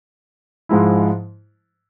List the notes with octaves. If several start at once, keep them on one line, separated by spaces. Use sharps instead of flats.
G#2 F3 G#3 E4